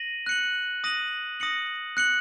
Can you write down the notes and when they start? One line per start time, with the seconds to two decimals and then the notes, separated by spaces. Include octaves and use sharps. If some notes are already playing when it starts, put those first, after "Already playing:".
Already playing: A#6 D#7 F#7
0.26 F#6 C#7 F#7
0.84 D#6 A#6 D#7 F#7
1.40 D#6 A#6 C#7 F#7
1.97 F#6 C#7 F#7